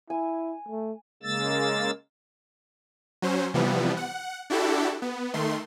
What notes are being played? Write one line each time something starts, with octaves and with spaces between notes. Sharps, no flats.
E4 G#5
A3
C#3 G#3 A#3 E6 A6
F#3 C#4 C5
C3 E3 F3 G3 B3
F#5
D4 E4 F#4 G4 A4
B3
D#3 A3 C6